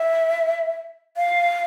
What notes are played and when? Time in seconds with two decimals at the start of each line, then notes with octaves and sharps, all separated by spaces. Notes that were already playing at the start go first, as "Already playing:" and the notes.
Already playing: E5
1.17 F5